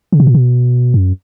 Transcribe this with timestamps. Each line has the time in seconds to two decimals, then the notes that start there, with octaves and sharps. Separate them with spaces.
0.12 C#3
0.20 B2
0.27 A#2
0.35 B2
0.94 F#2